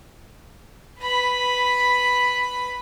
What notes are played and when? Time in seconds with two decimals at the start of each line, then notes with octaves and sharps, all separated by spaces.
1.00 B4 B5